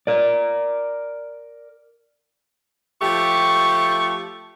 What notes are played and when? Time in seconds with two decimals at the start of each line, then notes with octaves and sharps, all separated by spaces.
0.07 A#4 D5
3.01 F3 A3 G4 C#6